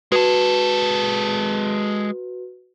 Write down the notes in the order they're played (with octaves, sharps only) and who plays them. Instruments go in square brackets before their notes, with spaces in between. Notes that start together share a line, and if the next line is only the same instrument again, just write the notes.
[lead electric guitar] G#3 A4 [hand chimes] F#4 B4